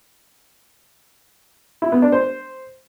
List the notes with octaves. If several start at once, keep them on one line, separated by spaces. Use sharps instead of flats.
E4
B3
D4
C5